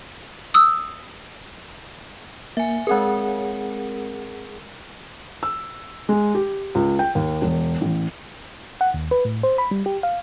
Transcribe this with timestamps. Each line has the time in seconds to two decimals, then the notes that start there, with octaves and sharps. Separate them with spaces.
0.54 D#6 E6
2.57 A#3 E5 G#5
2.87 G#3 C4 G#4 A#4 F#5
5.43 E6
6.09 G#3
6.35 G4
6.75 C#2
6.99 G5
7.15 D#2
7.42 E1
7.81 A1
8.81 F#5
8.94 D#2
9.11 B4
9.25 A2
9.43 C5
9.58 B5
9.71 G3
9.86 G4
10.03 F5